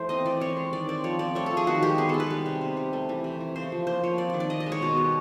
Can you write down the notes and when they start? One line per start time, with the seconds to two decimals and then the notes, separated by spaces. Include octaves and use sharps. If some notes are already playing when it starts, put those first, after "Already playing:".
Already playing: E3 A3 C5
0.09 C4 D#5
0.26 E3 D5
0.40 C4 C#5
0.57 G#3
0.73 D#3 D5
0.89 C4 D5
1.04 F3 C#5
1.19 C4 D5
1.35 A3 C#5
1.46 F3 A4
1.57 G#4
1.67 D#3 F#4
1.82 G#3 G4
1.98 B3 G#4
2.09 G#3 A4
2.20 B4
2.30 G3
2.46 C3
2.61 C3
2.77 G3
2.93 A3
3.09 E3
3.24 C3
3.41 E3
3.56 C#3 C5
3.72 F3
3.87 A#3 C5
4.03 F3 C#5
4.18 C4 D5
4.30 D#3 D5
4.40 D5
4.49 D#3 D#5
4.60 D#5
4.66 G#3
4.72 C#5
4.82 B2
4.97 G3